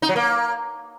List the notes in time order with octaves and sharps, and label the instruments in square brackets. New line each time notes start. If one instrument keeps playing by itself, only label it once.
[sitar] D#4
F#3
A#3